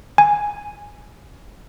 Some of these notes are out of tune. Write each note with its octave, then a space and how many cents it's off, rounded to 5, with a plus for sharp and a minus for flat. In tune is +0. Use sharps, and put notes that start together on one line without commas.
G#5 -5